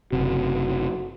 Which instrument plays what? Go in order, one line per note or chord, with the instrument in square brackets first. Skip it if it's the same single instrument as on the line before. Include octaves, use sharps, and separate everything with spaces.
[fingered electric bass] F#1 C3 [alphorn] F#4